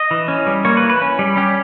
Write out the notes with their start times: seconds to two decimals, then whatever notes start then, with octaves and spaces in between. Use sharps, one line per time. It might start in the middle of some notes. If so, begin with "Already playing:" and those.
Already playing: D#5
0.11 E3
0.28 C#4
0.46 G3
0.65 A#3 C#5
0.77 B4
0.83 E3
0.90 B4
1.02 C#4
1.19 G3
1.37 C#4 G4